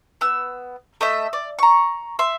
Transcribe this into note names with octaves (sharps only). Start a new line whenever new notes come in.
B3 E6
A3 D#5 E5
D5
A#5 C#6
E5 C6